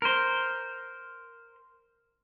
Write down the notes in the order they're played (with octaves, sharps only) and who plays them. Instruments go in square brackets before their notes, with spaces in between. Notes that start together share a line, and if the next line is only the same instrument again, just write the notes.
[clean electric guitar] A#4 C5